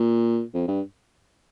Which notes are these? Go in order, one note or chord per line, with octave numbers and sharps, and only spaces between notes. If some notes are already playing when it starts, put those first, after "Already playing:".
Already playing: A#2
F2
G2